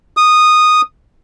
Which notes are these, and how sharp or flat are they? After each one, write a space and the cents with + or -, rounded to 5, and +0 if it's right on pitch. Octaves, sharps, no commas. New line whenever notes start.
D#6 -10